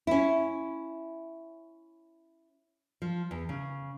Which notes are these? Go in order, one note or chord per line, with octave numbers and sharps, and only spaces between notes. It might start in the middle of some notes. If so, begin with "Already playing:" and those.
C#4 E4
F3
E2
C#3